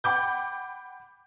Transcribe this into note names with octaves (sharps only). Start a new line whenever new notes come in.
F#5 G5 B5 D6 G6